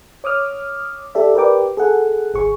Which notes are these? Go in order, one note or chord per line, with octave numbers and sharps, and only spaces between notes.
C#5 D6 D#6 F6
G4 A4 D5 E5
G4 A#4 B4 D5 G5 D6
G#4 A4 F#5
G1 G#4 C#6